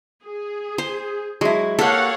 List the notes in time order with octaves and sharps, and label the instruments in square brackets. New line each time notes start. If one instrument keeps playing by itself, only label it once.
[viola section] G#4
[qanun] C5
[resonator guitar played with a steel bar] F#3 E4 [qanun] G#3
[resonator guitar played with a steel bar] A#3 G4 [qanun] A4 [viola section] C#5 F5 F#5